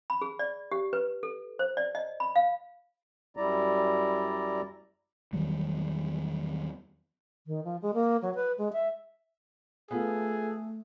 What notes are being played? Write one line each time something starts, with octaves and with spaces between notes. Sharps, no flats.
B5
G#4
D5
G4
B4
A4
C5
D5
D#5
B5
F5
F#2 G3 E4 D5 A#5
E2 D#3 F#3 G3
D#3
F3
G#3
A#3
F#3
B4
G#3
E5
A3 B3 F4 G#4 A4